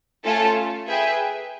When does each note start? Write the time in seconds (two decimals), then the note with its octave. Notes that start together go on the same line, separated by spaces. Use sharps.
0.24 A3 C#4 F4 A4
0.87 G#4 B4 E5 G5